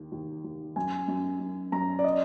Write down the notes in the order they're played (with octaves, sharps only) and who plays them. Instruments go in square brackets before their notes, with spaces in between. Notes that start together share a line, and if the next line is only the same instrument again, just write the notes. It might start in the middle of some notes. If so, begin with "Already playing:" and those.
Already playing: [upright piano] D#2
D#2
D#2
[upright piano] F#2 [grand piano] G#5
[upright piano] F#2
F#2
[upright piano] F#2 [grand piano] A#5
[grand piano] D5
D#5